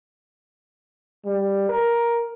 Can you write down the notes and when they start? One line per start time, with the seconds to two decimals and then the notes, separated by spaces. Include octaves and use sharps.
1.25 G3
1.69 A#4